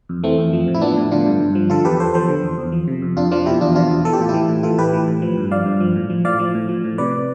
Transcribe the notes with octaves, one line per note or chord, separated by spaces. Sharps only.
F2
E3 A3 C4
F2
F3
A2
E4
F3 B3 D4
A2
D3 D4 F4
G2
G2
F3
D3 F4 A4
E2 G4 B4
E2 A4 C5
F3 A4 C5
D3
E2
E2
F3
C3
F2
F2 D4 F4
F3 D4 F4
B2 E4 G4
E2 D4 F4
B2 D4 F4
E2
E3 A4
G4
A2 F4
E4 G4
E3
A2
E3 F4 A4
A2 G4 B4
E3
A2
F3
G2
F3 D5 F5
G2
F3
A2
F3
A2 D5 F5
F3
A2
F3
A2
C3 B4 D5